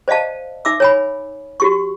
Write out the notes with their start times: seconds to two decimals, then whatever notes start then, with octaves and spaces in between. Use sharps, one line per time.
0.08 C5 D5 D#5 F5 A5
0.65 D#4 E5 D6 E6
0.80 C#5 G#5 B5
1.60 F#4 G4 C#6